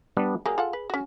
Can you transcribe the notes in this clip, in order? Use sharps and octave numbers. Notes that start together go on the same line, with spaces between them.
G3 B3 D4
F#3 G3 A#3 G#4
F4 A4 F#5
B4
C#4 F#4